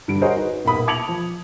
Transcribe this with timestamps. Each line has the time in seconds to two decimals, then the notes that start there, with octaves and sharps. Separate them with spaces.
0.08 G2 D3 G3 D7
0.21 F#4 G#4 A#4 C5 C#5 D#5
0.37 D#4 B4
0.65 D#1 A#3 B3 B5 D#6
0.87 A5 D6 G#6 C#7 F7 F#7
1.08 F3